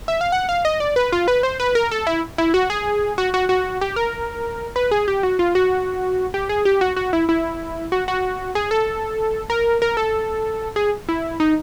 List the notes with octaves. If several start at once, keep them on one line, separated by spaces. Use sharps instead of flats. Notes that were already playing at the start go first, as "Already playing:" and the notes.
E5
F5
F#5
F5
D#5
D5
B4
F4
B4
C5
B4
A#4
A4
E4
E4
F#4
G#4
F#4
F#4
F#4
G4
A#4
B4
G#4
G4
F#4
F4
F#4
G4
G#4
G4
F#4
F#4
E4
E4
F#4
F#4
G#4
A4
A#4
A#4
A4
G#4
E4
D#4